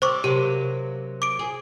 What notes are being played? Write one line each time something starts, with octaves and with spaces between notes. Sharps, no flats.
G3 C4 C5 C#6 D6
C3 F#3 A#3 G4
D6 D7
G#4